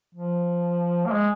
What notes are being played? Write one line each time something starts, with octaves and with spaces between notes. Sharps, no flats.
F3
A#3
G#3